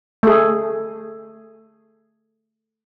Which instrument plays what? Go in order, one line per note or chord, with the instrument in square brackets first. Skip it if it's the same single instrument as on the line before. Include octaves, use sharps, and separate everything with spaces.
[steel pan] A3 G#4